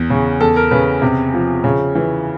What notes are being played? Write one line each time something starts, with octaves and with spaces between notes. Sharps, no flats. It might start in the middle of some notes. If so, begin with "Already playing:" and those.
Already playing: E2
C#3
E2 A4
A#4
C#3 B4
C3
F3
C#3
E3